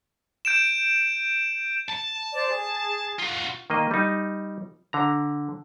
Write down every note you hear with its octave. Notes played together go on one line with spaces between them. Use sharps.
G6 D7 E7
A5
C5 D5
G#4
F4 F#4
D#3 A#3 D#5
G3 D#4
D3 A#5